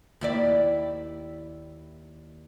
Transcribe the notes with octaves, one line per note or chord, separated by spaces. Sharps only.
D#2 E4 D5